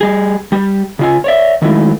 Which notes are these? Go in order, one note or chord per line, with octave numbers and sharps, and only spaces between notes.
G3 G#4
G3 G4
C#3 F4 G#5
C#5 D5 E5
D#3 F#3 G#3 A3 E4